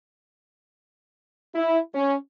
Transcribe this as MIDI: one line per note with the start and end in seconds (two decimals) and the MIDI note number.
1.54 1.79 64
1.93 2.15 61